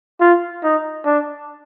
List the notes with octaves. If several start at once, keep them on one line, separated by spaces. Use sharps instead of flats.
F4
D#4
D4